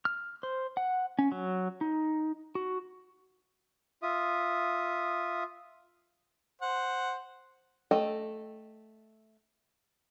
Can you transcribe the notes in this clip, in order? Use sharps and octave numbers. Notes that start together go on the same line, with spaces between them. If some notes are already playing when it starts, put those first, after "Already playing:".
F6
C5
F#5
C#4
F#3
D#4
F#4
F4 E5 D#6
C5 F#5
A3 A4 D#5 G5